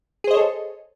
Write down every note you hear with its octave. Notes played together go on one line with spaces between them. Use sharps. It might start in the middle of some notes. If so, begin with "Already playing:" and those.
G#4 A4 C5 C#5 D#5